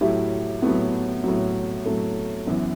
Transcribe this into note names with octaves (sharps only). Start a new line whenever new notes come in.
A2 F#3 E4 G4
A2 F#3 B3
A2 F#3
A2 F#3 A3
F#2 E3 B3